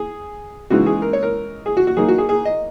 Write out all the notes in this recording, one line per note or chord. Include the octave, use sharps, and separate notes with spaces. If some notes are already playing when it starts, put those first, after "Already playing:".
Already playing: G#4
C#3 E3 G#3 D#4 F#4
G#4
A#4
C#5
A#4
G#4
F#4
F#4
F#3 A#3 D#4 G#4
F#4
G#4
G#4
D#5